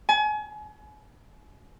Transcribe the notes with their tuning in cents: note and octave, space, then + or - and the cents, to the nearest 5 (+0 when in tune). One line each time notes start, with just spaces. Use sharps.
G#5 +35